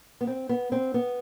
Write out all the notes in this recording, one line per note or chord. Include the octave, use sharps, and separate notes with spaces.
B3
C4
B3
C4
B3